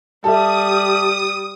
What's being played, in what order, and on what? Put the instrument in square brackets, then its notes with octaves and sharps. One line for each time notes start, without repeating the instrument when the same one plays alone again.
[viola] G3 [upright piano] A4 E5 [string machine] D#6